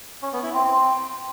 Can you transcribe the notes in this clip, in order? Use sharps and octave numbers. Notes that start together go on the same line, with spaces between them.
C#4
B3
E4
C4
C4